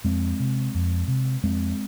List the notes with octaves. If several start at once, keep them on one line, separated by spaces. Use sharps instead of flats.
F2 G#3 C4
C3
F2
C3
F2 G#3 C4